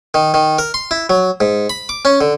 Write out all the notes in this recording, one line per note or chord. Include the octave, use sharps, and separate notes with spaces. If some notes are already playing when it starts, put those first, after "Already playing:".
D#3
D#3
A#4
C6
E4
F#3
G#2
B5
D6
C#4
D3